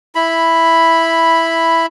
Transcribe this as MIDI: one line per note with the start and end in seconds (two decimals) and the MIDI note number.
0.15 1.86 64
0.15 1.86 83